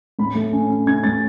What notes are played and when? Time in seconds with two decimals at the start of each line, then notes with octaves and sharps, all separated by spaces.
0.19 A2 B5
0.35 A3
0.53 C#4
0.70 C#4
0.87 C#4 G#6
1.04 A2 A6